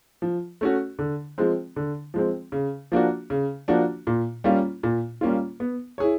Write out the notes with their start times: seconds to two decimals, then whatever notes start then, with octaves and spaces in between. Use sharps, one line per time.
0.22 F3
0.61 A3 C#4 F#4
0.99 D3
1.38 F3 G#3 C4
1.76 D3
2.14 F3 G#3 C4
2.52 C#3
2.92 F3 A#3 D4 F#4
3.30 C#3
3.68 F3 A#3 D4 F#4
4.07 A#2
4.44 G3 A#3 C#4 F4
4.83 A#2
5.21 G3 A#3 C#4 F4
5.60 B3
5.98 E4 G#4 C#5